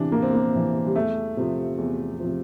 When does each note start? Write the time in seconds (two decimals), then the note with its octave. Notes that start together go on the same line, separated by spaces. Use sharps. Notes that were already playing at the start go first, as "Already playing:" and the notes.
Already playing: C3 E3 D4
0.12 E2 A#3
0.22 C4
0.34 A#3
0.54 C3 E3
0.86 G3
0.96 E2 A3
1.37 C3 F3
1.78 E2
2.20 C3 F3